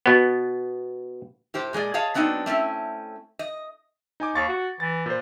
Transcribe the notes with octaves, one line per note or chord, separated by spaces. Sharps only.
B2 B3
A2 G4 C5
A#2 G#3 G#4 D5
G#4 C#5 D#5 F5 A5
F#3 B3 C4 D4 D#4
A3 C4 C#4 E4
D#5
D#4 G#5 D6
D#2 C#6 A6
F#4
E3 A6
A#2 C5